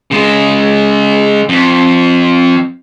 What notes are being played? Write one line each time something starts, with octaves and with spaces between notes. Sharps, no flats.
C#3 G#3
F2